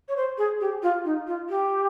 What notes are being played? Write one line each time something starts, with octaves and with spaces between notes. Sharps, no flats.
C#5
C5
G#4
G4
F4
D#4
F4
G4